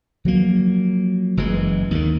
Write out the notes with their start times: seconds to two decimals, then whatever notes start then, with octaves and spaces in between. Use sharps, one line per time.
0.25 F3 F#3 A#3
1.37 F#1 E3 G#3
1.91 D#2 D#3